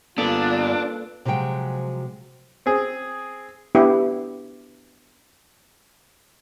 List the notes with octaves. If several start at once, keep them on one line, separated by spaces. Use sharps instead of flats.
G2 A#3 B3 D4 F4 A4 B4
C3 F3 F#3 G#3 G5
C4 G#4
B3 D4 E4 G4